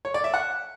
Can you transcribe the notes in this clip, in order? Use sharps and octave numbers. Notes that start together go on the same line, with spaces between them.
C#5
D5
E5
F#5